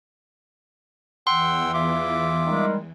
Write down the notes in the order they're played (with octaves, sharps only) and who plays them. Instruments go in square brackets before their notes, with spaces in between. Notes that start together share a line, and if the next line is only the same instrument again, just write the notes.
[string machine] E2 E3 [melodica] F#5 G5 E6 [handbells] C6
[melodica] F4 E5 D6
[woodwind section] D#3 G3 G#3